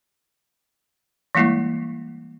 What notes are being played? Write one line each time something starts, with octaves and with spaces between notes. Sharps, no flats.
E3 G3 G#3 A#3 E4